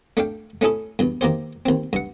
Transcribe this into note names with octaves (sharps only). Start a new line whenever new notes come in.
A3 D4 F5 G5
A3 C#4 E4 G#4 A4
E2 G2
D#3 A#3 G4 C5
D#2 C4
G2 F#5